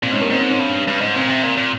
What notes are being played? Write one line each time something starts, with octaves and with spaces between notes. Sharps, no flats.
A#2 C4
G#2 C#4
G2 A#3
G#2 C4
C4
C#4
G2
G2
G#2
A#2 C4
C3
A#2
A#2